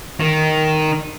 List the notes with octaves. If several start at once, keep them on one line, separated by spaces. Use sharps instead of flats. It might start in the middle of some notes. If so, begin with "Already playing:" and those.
D#3